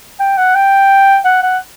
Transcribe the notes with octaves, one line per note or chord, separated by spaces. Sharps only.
G5
F#5
G5
F#5
F#5